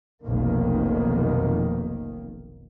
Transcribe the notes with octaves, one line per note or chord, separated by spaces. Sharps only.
F1 B1 D#3 A#3